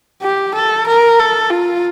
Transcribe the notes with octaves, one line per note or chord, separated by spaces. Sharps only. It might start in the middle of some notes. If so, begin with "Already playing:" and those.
G4
A4
A#4
A4
F4